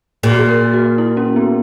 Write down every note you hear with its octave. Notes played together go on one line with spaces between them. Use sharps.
A#2 G#4
F#4
G#4
A#4
F#4
E4
C#4
B3